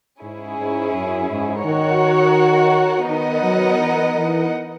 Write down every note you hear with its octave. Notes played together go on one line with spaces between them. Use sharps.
G#2 C#4 E4 G#4
G#2
F#2
G#2
D#3 F#4 A#4 C#5 F#5
D#3 B3 D#4 A#4 D#5 F#5
F#3
E3
E3